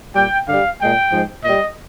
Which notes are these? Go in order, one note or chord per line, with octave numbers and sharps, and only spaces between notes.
A#2 G3 G5
G2 D3 G3 F5
A#2 G#3 G5
G#2 F3 G#3
A#2 G3 D#5